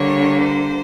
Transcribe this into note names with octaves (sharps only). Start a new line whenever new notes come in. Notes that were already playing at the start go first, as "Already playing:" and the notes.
Already playing: D3 G3 A#3 C#5
C5